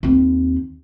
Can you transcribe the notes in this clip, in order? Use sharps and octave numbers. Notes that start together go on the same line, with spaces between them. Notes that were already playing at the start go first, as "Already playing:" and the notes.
D#2 C4